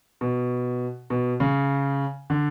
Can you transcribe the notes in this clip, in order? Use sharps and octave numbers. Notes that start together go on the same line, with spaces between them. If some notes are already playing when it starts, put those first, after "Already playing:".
B2
B2
C#3
D3